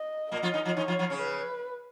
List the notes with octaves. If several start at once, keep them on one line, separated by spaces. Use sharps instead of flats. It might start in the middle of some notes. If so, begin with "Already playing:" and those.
Already playing: D#5
A#2 A#3 D#5
F3 F4
D#3 D#4
F3 F4
D#3 D#4 C#5
F3 F4
F3 F4
C#3 C#4
B4